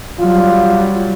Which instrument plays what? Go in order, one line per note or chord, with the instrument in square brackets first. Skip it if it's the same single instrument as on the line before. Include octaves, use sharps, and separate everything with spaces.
[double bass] F#3 G3 [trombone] F4